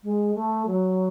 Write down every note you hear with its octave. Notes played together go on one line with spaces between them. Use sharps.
G#3
A3
F#3